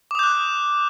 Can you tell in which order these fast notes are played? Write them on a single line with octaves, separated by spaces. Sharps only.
D6 D#6 G6 F#6